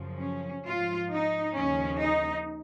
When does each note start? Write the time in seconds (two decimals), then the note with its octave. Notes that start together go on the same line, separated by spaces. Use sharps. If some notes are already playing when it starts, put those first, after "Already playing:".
Already playing: F#2 C#3 F3
0.20 C#4
0.65 G#2 F3 F4
1.11 D#4
1.55 D#2 C#3 F3 C#4
2.00 D#4